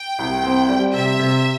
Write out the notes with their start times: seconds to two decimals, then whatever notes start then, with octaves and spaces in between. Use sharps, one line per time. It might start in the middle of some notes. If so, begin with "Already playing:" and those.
Already playing: G5
0.19 C2
0.43 C4
0.69 G3
0.93 C3 E5
1.19 C3